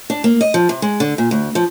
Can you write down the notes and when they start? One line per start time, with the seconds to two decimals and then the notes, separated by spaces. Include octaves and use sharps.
0.10 D4
0.24 A#3
0.41 D#5
0.54 F3
0.69 C3
0.82 G#3
1.00 D3
1.18 A#2
1.31 D2
1.55 F3